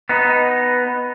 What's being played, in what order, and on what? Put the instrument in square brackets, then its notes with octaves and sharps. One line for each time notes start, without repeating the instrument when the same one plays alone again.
[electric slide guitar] B3 D#4